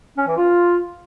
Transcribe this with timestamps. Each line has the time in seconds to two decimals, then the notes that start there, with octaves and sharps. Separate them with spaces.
0.17 C#4
0.27 E3
0.37 F4